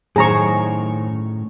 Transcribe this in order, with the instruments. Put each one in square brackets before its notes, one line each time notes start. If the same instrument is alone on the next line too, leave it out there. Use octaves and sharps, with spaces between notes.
[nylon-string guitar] F#2 D#3 C5 [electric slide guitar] A2 [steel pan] G#4 A#5 C#6